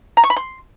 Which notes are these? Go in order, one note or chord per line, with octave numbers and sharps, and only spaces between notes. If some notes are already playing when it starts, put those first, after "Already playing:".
A#5
C#6
B5
C6